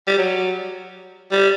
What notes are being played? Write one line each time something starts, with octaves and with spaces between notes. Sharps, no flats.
G3
F#3
G3